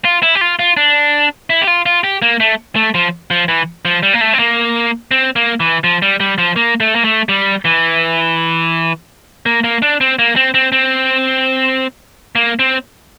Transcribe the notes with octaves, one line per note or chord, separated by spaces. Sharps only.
F4
E4
G4
F4
F4
D4
E4
G4
F4
F4
G4
A#3
A3
A3
F3
F3
E3
F3
G3
A#3
A3
C4
A#3
C4
A#3
E3
F3
G3
G3
F3
A#3
A3
A#3
A3
G3
E3
A#3
A#3
D4
C4
A#3
C4
C4
C4
A#3
C4